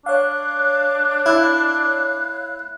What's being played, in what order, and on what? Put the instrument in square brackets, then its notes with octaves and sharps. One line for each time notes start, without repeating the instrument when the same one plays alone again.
[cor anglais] D4 [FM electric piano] C#5 F5 [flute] F#6
[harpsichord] E4